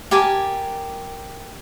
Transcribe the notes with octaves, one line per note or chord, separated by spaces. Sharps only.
G4 A#4 G#5 A5